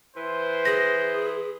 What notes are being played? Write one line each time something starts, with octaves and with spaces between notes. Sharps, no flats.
E3 C5
G#4 A#6